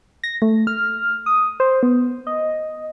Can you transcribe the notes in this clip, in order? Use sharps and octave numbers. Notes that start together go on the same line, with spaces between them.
A#6
A3
F6
D#6
C5
B3
D#5